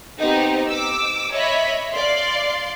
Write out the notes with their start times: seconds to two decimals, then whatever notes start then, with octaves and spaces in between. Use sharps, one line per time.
0.19 B3 C4 D#4 G4
0.68 D6 E6
1.32 C#5 D#5 E5 B5
1.92 D5 F5 C6